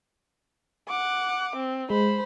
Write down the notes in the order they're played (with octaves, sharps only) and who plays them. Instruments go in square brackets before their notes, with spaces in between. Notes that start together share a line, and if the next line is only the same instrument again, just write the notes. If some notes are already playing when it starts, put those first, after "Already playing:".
[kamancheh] F#5 D6
C4
[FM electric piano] G#3 [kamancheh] C5 B5